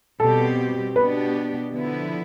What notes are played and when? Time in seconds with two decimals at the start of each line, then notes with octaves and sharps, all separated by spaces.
0.20 B2 G3 C4 G4 A4
0.96 B2 B3 D4 G4 B4
1.72 D3 F3 B3 E4